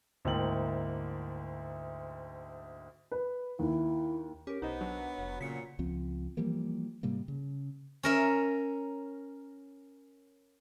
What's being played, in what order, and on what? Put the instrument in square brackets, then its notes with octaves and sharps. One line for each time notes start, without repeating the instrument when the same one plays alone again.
[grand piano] D2 G#2 A#3 E4 G5 F#7
[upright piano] B4
[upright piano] D#2 [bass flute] E4
[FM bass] C#4 [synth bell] G4 A#4
[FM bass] B1 [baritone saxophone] B3 [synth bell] D#4 C5 D#5
[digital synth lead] F#3 [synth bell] D4
[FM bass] F1
[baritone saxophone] A#2 [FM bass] C#3 [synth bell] B6 C#7
[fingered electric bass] C#2 F3 C4
E3 F3 G3 A#3
G#2 C3 G3 A#3
C#3
[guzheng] C#4 A#4 E5